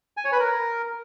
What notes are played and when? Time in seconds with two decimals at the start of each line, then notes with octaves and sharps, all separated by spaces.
0.17 G#5
0.25 C#5
0.32 B4
0.40 A#4